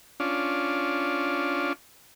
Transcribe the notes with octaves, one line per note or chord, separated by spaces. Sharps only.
C#4 D4 F4